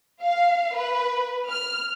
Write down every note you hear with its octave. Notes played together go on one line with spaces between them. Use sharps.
F5
B4
F6